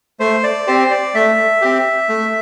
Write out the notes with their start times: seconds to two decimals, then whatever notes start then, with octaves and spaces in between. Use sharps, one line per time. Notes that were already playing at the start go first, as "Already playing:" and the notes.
0.20 A3 C5
0.43 D5
0.67 C4 G4 C5
0.91 D5
1.14 A3 E5
1.61 C4 G4
2.09 A3